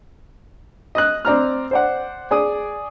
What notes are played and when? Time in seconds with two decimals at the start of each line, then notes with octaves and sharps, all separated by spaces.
0.95 D#5 D#6 F#6
1.25 C4 D5 A#5 F6
1.71 C5 D5 F#5
2.31 G#4 D5 D#6